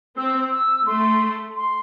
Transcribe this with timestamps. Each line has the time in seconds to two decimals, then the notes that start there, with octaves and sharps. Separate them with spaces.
0.17 C4 E6
0.51 E6
0.86 A3 C6
1.56 C6